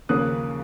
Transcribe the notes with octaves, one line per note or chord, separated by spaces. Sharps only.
D#2 C#3 F3 A#3 C#4 D#6 F#6